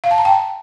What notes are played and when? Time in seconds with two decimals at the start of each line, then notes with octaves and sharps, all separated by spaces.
0.04 F5
0.11 A5
0.18 A#5
0.25 G5